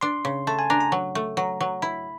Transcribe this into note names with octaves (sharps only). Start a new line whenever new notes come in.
D4 C6
C#3
A3 A5
G#5
D4 A#5
A#5
F#3
A3
F#3 A#5
F#3
E4 B5